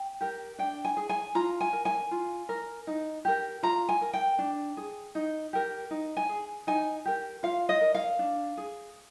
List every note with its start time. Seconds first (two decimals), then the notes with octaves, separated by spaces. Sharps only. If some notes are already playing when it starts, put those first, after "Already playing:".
Already playing: G5
0.21 G4 A#4
0.58 D4 G5
0.85 G#5
0.97 G#4
1.09 G#5
1.35 F4 A#5
1.61 G#5
1.73 A#4
1.85 G#5
2.11 F4
2.49 A#4
2.87 D#4
3.25 G4 A#4
3.63 F4 A#5
3.89 G#5
4.01 A#4
4.13 G5
4.39 D4
4.77 G#4
5.15 D#4
5.53 G4 A#4
5.91 D#4
6.17 G#5
6.29 G#4
6.67 D#4 G#5
7.05 G4 A#4
7.43 F4 F5
7.69 D#5
7.81 A#4
7.95 F5
8.19 D4
8.57 G#4